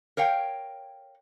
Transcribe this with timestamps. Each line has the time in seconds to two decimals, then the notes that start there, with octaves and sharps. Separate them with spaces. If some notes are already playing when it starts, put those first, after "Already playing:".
0.17 A#4 C#5 F5 G5